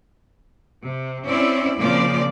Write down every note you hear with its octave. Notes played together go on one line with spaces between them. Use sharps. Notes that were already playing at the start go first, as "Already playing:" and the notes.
C3
C4 C#4 E4 D5
A#2 C#3 F3 C4 D5